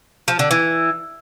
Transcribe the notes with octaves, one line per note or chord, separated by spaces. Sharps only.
F3
D3
E3